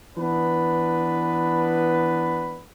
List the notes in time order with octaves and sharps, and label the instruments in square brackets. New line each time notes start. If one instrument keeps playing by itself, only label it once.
[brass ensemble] E3 B3 D4 B4